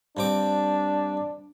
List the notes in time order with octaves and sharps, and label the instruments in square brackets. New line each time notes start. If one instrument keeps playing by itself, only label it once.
[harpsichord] G2 C4 D6 [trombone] D4